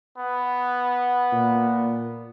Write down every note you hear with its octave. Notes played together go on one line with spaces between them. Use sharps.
B3
A#2